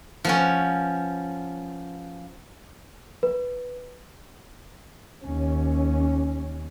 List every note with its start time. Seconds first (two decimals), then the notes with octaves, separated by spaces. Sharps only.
0.25 F3 B3 C#4
3.23 B4
5.22 D#2 C#4